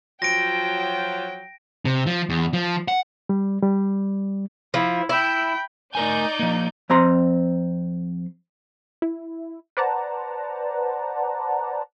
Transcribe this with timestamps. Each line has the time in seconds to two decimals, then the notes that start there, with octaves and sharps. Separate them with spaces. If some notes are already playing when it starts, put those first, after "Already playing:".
0.22 F3 F#3 G5 A#6 D7
1.85 C3
2.07 F3
2.30 E2
2.53 F3
2.88 F#5
3.29 G3
3.62 G3
4.74 F3 E4
5.09 E4 G5 B5
5.95 A3 D#4 A#4 D5 G#5 G6
6.39 F3 A#3
6.90 F2 C4 A#5 C6
9.02 E4
9.77 B4 C5 D5 F#5 A5 A#5